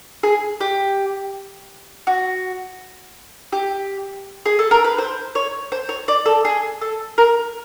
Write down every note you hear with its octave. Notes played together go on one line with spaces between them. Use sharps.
G#4
G4
F#4
G4
G#4
A4
A#4
B4
C5
C#5
C5
C#5
D5
A4
G#4
A4
A#4